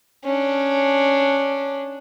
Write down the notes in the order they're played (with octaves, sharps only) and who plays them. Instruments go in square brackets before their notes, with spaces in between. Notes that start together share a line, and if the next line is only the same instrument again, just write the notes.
[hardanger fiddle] C#4 D4